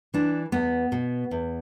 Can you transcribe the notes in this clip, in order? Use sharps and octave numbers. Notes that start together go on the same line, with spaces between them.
E3 D4
E2 B3
B2
E2